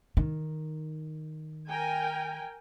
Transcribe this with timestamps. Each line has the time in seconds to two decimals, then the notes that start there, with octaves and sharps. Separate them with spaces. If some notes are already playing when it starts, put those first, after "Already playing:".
0.17 D#3
1.69 A#4 G5 G#5